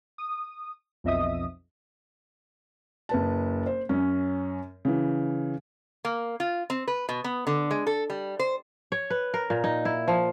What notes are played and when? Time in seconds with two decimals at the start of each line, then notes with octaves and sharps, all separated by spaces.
0.18 D#6
1.04 B1 F2 D#5 E5 D#6
3.09 F#1 B4 A5
3.66 C5
3.89 F#2 C#4
4.85 C#3 E3
6.05 A#3
6.40 F4
6.70 C4
6.88 B4
7.09 B2
7.24 B3
7.47 D3
7.71 G#3
7.87 A4
8.10 G3
8.39 C5
8.92 C#5
9.10 B4
9.34 A#4
9.50 A#2
9.64 D#4
9.85 E4
10.08 F3